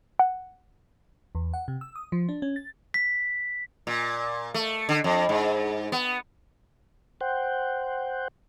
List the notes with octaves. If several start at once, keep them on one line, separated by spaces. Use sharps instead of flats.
F#5
E2
F#5
C3
E6
D#6
F3
D4
C#4
A6
B6
A#2
A3
D3
F2
G#2
B3
C5 F#5 G5